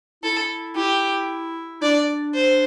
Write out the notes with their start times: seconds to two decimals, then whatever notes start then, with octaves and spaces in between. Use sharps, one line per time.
0.23 E4 A4
0.76 E4 G4
1.81 D4 D5
2.35 C5